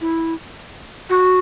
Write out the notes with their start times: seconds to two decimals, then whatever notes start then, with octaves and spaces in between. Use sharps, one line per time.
0.01 E4
1.10 F#4